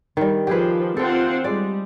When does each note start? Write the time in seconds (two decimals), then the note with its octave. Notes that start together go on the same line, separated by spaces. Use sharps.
0.17 D#3 G3
0.47 F3 G4 G#4 B4
0.97 C4 F4 A4 F#5 G5
1.44 G3 G#3 D5